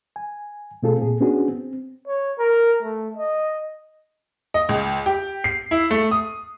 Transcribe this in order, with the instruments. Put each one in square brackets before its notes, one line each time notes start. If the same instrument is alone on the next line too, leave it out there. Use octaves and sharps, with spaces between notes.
[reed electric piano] G#5
B2 A3 C4 F4 G#4 A4
A#2 G#4
B3 C#4 D4 F#4 G#4
C4
[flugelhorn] C#5
A#4
A3
D#5
[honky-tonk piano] D#5
C#2
G4
C7
E4
A3
D#6